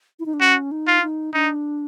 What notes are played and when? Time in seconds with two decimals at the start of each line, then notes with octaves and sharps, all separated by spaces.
0.20 E4
0.26 D#4
0.34 D4
0.40 C#4 F#4
0.71 D#4
0.87 F4
1.02 D#4
1.34 D4 D#4